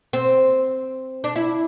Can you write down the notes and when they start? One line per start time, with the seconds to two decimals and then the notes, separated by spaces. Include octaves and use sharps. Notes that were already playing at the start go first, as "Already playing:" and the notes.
0.13 C4
1.24 D4
1.36 E4